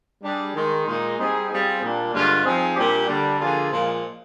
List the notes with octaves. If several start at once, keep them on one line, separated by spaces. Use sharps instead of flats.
G3 D4 G#4
D#3 G#3 D#4
A#2 G#3 D#4
G3 C4 D#4 G#4
G3 C4 F4 G#4
A#2 G3 D4
G2 D3 G#3 D4 F4
F3 C4 D#4 G#4
A#2 G3 D4 G4
D3 G3 D4
D3 F3 A#3 F4 G#4
A#2 F3 G#3